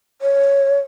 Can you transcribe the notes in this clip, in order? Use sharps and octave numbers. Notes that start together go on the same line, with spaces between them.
C#5